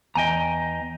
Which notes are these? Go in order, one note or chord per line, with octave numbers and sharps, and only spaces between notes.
E2 D#5 G5 G#5 A#5